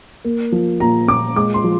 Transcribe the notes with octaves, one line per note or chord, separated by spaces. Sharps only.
A#3
F3
A#2 A#5
A#2 D6
G#3 D6
C6
F3